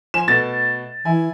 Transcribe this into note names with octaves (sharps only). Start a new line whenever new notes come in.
F3 G#5 E7
B2 A3 A6
E3 E4 G#5